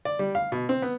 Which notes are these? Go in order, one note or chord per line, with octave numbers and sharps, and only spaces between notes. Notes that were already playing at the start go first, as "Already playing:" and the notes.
D5
G3
F5
B2
C4
B3